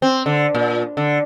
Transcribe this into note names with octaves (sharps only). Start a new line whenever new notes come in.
C4
D3
A#2
D3